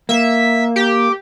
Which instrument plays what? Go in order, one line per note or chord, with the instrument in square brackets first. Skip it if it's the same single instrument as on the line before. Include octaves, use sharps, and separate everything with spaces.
[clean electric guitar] A#3 [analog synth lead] E5
[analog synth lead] G4